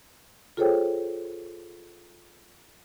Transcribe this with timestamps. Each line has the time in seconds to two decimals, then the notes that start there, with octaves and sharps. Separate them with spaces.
0.57 F4 G#4 A4 C5 C#5 G5